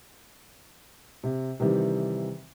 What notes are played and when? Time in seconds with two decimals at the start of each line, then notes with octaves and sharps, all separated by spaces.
1.24 C3
1.60 C3 D#3 E3 G3